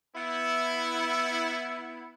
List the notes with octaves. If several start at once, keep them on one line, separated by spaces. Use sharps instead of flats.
B3 E4